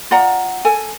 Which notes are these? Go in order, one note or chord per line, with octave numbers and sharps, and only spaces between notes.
F4 D5 F#5 A#5
A4 G#5